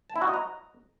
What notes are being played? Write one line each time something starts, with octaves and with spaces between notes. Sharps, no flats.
A5
E4
F#4
D#5
A#5